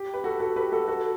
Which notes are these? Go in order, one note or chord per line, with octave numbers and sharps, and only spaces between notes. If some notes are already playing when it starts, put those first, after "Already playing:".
Already playing: G4
B4
F#4 A4
F#4 A4
G4 B4
F#4 A4
F#4 A4